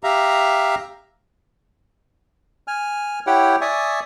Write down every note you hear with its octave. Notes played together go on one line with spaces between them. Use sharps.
G4 E5 F5 A#5
G#5 F6
E4 G4 C#5 F#5 G5
D5 E5 G#5 C#6 D#6